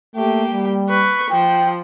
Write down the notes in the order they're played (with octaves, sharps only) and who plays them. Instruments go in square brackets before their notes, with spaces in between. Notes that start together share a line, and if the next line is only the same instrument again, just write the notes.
[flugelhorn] A3 [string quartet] A#3 G4
[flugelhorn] G3
[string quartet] B4 C#6
[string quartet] F3 [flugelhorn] G5